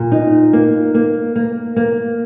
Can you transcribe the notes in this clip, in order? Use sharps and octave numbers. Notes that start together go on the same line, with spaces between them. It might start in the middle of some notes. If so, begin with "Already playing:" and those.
Already playing: A#2
D#4
A#3
A#3
A#3
A#3